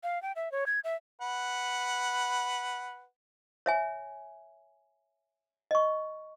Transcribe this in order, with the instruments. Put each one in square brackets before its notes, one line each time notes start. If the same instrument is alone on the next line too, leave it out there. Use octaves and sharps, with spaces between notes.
[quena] F5
G5
E5
C#5
G#6
E5
[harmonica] B4 F#5
[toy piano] C#5 E5 G#5
D#5 C#6